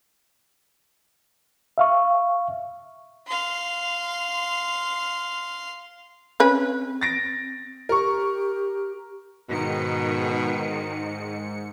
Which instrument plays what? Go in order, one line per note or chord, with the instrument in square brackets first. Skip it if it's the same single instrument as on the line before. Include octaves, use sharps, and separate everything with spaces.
[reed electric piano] E5 F5 C#6
[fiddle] F5 C6
[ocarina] C4 [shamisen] C#4 B4
[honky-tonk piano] A6 A#6 D7
[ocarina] G4 [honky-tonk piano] A#4 C#6
[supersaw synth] G#2 C#7 [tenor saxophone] B2 [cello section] D#3